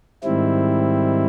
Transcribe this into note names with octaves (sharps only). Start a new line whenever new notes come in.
G#2 D#3 G3 C4 E4